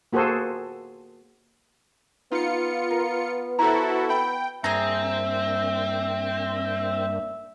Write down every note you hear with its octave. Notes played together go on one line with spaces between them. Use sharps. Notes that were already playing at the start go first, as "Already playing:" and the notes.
A#3 F#4 G#4 A4 C5
B3 D#4 F4 C#7
A#4
E4 F#4 A4 C5 A#5
E5 G5 B5
G2 A#3 C4 D4 G#4 E5 A#5